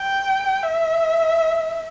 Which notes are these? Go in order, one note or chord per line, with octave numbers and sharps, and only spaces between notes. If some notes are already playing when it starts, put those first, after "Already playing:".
Already playing: G5
E5